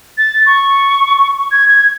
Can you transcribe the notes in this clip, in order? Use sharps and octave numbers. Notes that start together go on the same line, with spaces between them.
A6
C#6
G#6
G#6